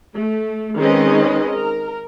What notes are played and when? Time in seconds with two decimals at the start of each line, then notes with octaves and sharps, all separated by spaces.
0.15 A3
0.77 D#3 G#3 C4 C#4 B4 D#5
1.53 A#4